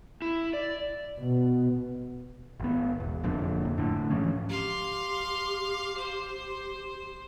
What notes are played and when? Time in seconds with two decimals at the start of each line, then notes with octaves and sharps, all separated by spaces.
0.22 E4
0.53 D5
1.19 B2
2.60 G#1 B3
3.00 E1
3.23 F1 F2 A#2 D3
3.65 F2
3.78 A2 D3
4.10 G#2 E3 F3 C#4
4.49 G4 F5 C6
5.97 C5